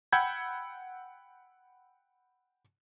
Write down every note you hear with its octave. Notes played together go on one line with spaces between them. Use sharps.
F#5 G5 B5 E6 G6 G#6